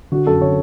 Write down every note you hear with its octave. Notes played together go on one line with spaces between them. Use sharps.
D3 F#4
F#2 A4
D3 C#5